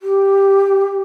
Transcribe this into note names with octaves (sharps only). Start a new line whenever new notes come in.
G4